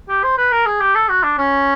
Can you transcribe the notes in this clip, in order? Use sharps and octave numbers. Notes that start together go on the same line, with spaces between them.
G4
C5
B4
A#4
G#4
G4
A4
F#4
D4
C#4